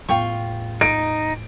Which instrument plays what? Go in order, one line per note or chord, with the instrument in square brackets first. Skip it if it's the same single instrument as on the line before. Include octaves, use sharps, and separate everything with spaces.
[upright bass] A1 E2 [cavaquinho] F4 G5 C#6
[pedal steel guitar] D#4 [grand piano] D7